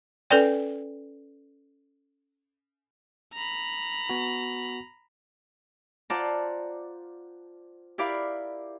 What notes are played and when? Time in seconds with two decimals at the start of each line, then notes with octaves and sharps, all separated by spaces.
0.30 C#4 A4 B4 D5 G5
3.33 A#5 B5
4.10 B3 F#4
6.10 F4 C5 D5 F#5 A5 A#5
7.98 E4 G4 A#4 D5 F5 B5